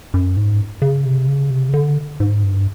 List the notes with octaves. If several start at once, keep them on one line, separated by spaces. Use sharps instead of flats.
F#2
G#2
C#3
C3
C#3
C3
C#3
D3
G#2
G2